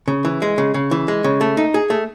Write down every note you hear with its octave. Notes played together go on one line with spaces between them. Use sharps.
C#3
E3
G#3
C#3
C#3
E3
G#3
C#3
A3
D#4
G#4
A3